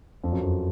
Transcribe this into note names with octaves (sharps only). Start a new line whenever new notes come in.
F2
F#2
F2